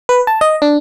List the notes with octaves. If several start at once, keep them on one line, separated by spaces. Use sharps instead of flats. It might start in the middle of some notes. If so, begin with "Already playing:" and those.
B4
A5
D#5
D4